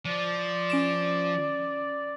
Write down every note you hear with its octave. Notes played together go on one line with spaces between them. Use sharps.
F3 D5
C#4 D7 E7